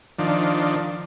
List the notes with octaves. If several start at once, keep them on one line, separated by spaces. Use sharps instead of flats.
D#3 F3 D4